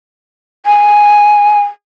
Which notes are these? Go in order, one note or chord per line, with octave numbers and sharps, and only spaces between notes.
G#5